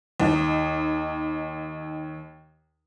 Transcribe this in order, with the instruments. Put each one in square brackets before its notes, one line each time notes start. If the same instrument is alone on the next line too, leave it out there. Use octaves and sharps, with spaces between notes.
[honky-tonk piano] D#2 D#4